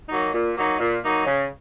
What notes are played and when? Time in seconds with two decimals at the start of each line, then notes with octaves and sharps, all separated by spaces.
0.09 F#3 A#3 D#4
0.33 A#2
0.56 F#3 A#3 D#4
0.79 A#2
1.03 F#3 A#3 D#4
1.26 C#3